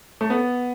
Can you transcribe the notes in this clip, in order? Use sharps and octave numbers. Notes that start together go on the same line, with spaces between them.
A3
B3